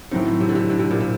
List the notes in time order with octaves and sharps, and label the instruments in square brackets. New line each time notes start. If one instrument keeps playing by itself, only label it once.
[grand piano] A2 F#3 C4 [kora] D#3
[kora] C3
D3
C3
D3
C3
A#2
C3